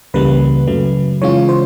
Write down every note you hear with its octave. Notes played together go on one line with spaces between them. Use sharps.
C#2 C#3 E3 G3 A#3 B4
F#2 C#3 F#3 A3
C#3 E3 G#3 C#4 F4 C#5
C5